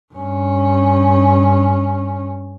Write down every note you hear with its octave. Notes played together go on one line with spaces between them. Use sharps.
G2 C#4